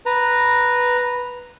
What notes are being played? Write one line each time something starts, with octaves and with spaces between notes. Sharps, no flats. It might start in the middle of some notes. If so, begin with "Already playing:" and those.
B4 A#5